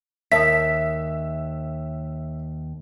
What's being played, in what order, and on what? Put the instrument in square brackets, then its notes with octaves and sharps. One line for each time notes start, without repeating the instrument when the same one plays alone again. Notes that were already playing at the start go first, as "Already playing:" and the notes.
[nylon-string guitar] D#2 [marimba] A#4 A5 D#6 [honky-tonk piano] E5 [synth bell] B6